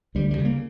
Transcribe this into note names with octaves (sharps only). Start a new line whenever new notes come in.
D2 G3
G3
C#3
A#3